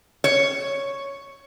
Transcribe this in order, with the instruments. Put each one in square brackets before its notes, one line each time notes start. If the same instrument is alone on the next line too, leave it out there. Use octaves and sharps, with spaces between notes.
[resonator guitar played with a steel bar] C#5